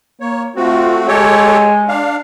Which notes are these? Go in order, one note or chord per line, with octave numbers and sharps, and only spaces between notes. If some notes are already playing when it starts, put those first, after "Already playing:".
A#3 C#5
A3 C4 F4 F#4
G#3 G4 A4 C#5
D4 F5